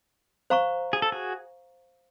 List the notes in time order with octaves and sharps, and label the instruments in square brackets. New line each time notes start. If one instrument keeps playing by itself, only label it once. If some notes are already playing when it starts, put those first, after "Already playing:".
[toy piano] C5 F5 A#5 C#6
[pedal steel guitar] G#4
A4
F#4 G#4